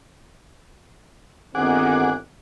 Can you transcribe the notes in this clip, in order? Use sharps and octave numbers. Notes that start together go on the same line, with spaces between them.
G1 D#3 C4 G#4 F#5 D6